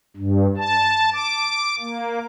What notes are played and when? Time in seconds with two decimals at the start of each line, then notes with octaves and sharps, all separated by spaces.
0.16 G2
0.57 A5
1.13 D6
1.79 A#3